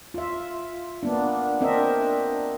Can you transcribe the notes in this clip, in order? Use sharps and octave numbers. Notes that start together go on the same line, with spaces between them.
F4 E5
A#3 B3 D4
C4 D4 A#4 D#5 E5